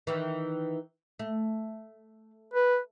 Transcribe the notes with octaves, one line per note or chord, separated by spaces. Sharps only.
D#3 E3
A3
B4